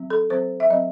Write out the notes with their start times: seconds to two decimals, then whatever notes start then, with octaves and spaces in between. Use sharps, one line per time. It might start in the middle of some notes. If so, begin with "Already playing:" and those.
Already playing: F#3 C4
0.10 A4
0.30 F#3 C4 C5
0.60 E5
0.70 F#3 C4 D#5